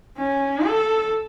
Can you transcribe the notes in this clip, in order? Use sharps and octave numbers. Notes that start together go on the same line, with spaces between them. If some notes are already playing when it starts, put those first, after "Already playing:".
C#4
A4